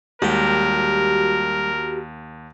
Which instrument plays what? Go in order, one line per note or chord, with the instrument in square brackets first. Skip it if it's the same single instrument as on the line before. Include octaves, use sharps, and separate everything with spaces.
[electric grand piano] D#2 [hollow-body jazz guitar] G3 G#3 [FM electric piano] F#4 G4 [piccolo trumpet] A#4